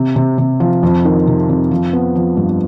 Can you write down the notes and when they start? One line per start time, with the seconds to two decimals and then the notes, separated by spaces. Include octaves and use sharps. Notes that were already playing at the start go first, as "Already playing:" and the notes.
Already playing: C3
0.16 C3
0.38 C3
0.60 F3
0.83 F2
1.05 D#3
1.27 C3
1.49 F2
1.71 F3
1.93 B3
2.15 F3
2.37 G2